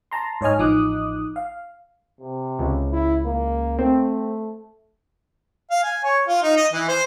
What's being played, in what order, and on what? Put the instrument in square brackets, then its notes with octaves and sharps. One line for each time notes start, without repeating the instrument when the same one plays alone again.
[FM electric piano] A5 A#5 C6
G#2 C#5 D#5 G#5 F6
A1 F3 D#4 D6 D#6 F#6
F5
[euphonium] C3
[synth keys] C#2
[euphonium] E4
A#3
[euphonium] A3 [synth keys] C4
[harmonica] F5
G#5
C#5
F4
D#4
D#5
E3
C5